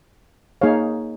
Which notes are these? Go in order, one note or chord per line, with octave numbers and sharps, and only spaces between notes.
A#3 D#4 G#4 C#5 F5